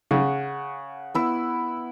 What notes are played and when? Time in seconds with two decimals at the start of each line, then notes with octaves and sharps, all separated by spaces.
0.11 C#3 F#5
1.15 B3 E4 E6